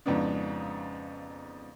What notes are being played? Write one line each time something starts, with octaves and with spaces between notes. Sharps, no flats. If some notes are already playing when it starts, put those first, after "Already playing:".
F2 G#2 C#3 B3 D4